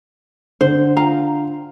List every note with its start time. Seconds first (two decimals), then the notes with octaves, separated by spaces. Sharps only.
0.61 D3 C5
0.97 F4 F5 A#5